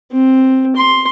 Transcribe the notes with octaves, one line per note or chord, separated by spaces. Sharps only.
C4
C6